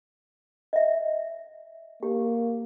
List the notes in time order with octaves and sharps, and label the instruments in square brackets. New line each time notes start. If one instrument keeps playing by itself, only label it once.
[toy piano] D#5 E5
[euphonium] A#3 [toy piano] G4